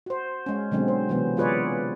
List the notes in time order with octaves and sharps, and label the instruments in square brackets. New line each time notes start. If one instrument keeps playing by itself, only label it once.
[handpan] F#4 C5
G#3 C#4
B2 D3 F#3 G#3 C4
C5
C3 E3 F#3 B3
F4 G#4 B4 C#5 D5